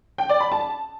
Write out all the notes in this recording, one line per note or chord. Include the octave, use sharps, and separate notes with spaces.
G5
D5
B5
A5